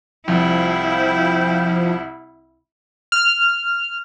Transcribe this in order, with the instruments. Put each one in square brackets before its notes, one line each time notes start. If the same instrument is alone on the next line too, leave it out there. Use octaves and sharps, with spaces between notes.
[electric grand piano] C2 [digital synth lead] F3 [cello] E4 [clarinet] G5
[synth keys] F6